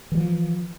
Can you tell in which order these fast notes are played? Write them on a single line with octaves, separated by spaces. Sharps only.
E3 G3 F3